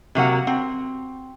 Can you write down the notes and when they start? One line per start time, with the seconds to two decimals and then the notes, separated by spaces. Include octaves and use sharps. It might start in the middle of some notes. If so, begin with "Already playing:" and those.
0.15 C3 F#3 A#3 F#5
0.47 C4